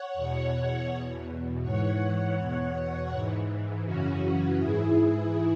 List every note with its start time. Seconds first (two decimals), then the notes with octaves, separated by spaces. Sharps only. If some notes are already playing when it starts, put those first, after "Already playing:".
Already playing: C#5 F#5
0.14 E2 B2
0.88 E2 B2
1.62 G#2 E3 C#5 F#5
2.37 E2 B2
3.11 G#2 E3
3.85 F#2 C#3 E3 C#4 F#4
4.59 G#2 E3 E4 G#4
4.96 E4 G#4